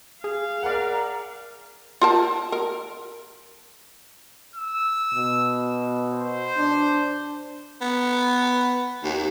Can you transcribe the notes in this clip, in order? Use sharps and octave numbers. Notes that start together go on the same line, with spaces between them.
G#4 F5
A#4 D5 F#5
F4 A#4 A5
A#4
E6
B2
C5
D4
B3
D#2